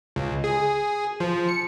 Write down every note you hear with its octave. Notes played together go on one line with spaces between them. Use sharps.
C#2
G#4
F3
C#7